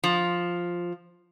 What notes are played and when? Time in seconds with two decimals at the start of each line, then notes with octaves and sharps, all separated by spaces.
0.04 F3